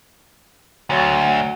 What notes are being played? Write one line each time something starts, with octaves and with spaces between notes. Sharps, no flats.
D2 F#3